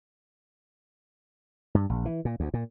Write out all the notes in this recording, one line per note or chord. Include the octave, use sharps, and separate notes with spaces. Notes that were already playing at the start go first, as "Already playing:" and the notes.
G2
A#1
E3
A#2
D2
A#2